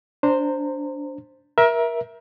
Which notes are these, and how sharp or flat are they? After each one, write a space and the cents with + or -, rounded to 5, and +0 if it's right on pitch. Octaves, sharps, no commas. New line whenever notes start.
D4 -15 C5 +0 A#5 -25
A#4 +25 E5 +0